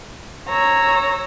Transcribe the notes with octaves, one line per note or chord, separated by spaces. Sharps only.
C#5 A#5 E6